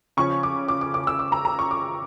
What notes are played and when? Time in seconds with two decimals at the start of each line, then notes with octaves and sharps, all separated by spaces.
0.17 C#3 F3 C#4 C#6
0.43 D6
0.68 D6
0.81 D6
0.94 D6
1.07 E6
1.19 D6
1.32 A#5
1.45 A#5
1.59 C#6
1.71 D6